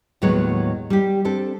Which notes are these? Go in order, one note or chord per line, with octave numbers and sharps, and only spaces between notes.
D#2 A2 F#3 G#3 B3 C#5
G3 G4
C4 D4 A4